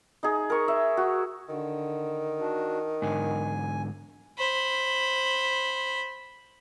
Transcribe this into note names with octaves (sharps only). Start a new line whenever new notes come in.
D#4 G#4
A#4 C#6
E5
F#4
D3 D#3
D4 F#4
G#2 D3 G#5
C5 B5